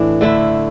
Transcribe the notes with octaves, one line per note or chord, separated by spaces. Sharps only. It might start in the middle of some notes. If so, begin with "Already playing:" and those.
Already playing: A2 E3 D4
D3 A3 E4